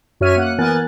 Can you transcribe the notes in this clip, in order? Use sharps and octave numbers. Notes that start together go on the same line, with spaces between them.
F#2 F#4 C#5 E5 F6 D#7
A#3 F#5 F#6
E3 B3 A#4 G#5 F#6 A6